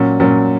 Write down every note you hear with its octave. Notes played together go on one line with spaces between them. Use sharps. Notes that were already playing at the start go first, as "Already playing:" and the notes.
Already playing: A#2 F#3 C#4
A#2 F#3 C#4